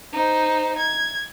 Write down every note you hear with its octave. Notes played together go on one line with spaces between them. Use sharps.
D#4 C5
G#6